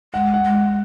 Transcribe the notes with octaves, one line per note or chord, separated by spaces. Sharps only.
G#3 F#5
F#5
G#3
F#5